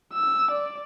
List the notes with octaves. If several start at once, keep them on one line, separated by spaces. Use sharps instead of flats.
E6
D5